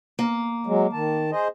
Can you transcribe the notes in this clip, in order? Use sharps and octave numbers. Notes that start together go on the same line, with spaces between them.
A#3
F#3 G#3
D#3 A5
G#4 C5 D#5